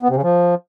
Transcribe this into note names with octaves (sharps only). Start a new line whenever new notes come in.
B3
C3
C#3
F3